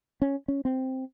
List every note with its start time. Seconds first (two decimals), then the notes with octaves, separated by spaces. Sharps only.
0.22 C#4
0.48 C#4
0.65 C4